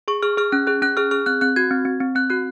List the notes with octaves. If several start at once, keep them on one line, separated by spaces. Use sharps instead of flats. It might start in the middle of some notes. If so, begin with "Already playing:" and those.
G#4 C#6
G#4 F6
G#4 F6
C#4 F#6
G#4 F#6
C#4 F#6
G#4 F6
G#4 F6
C4 F#6
C4 F#6
F#4 G#6
C4
C4
C4
C4 F#6
F#4 F#6